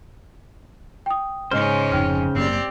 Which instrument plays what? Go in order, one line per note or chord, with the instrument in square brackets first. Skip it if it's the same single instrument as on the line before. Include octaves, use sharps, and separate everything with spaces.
[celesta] G5 D#6
[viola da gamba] G#2 G#3 C#4 [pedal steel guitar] C#3 C5 [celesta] D#5 F6
[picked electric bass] F1 F2 [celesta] D#4 G5 F6
[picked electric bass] F#1 F#2 A#3 [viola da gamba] C4 G4 D5